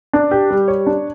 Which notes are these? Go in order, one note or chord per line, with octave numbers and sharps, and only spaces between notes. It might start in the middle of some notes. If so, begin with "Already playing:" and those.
D4
G4
G3
C#5
D4